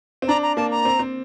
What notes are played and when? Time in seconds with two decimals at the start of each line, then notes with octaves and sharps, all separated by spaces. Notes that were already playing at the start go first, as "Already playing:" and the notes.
0.22 C4
0.28 D4 A#5
0.43 A#5
0.57 A#3 A5
0.71 A#5
0.85 C4
0.99 C4